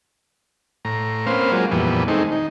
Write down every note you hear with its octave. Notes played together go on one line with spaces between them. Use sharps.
A2 A#5
A#3 C4 C#4 B4 C5 F5
F#3 G#3 A#3 F4
F2 A#2 E3 G3 B3
D#3 G#3 A3 C4 D#4
D#4